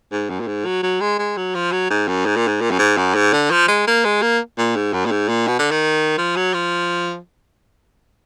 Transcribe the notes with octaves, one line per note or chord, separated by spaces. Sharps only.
G#2
F#2
A#2
G#2
F#3
F#3
G#3
G#3
F#3
F3
F#3
G#2
F#2
G#2
A#2
G#2
A#2
F#2
G#2
F#2
G#2
D3
F3
G#3
A#3
G#3
A#3
A#2
G#2
F#2
A#2
G#2
A#2
B2
D3
D#3
F3
F#3
F3